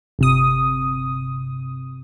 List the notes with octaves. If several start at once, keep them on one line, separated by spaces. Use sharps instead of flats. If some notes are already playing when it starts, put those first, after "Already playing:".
G1 C3 D#6